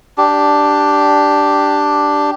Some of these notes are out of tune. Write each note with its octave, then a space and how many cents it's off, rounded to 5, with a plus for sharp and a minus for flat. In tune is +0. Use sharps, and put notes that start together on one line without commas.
D4 +0 G4 +0